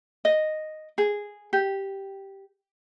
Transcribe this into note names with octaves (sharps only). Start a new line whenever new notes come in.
D#5
G#4
G4